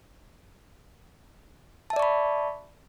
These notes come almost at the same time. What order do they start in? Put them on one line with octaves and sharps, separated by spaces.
A5 E5 D5 C#6 B5